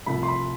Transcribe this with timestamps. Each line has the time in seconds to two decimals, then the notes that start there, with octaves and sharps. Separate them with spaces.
0.06 C2 C3 F3 A3 B5
0.23 C6
0.28 B5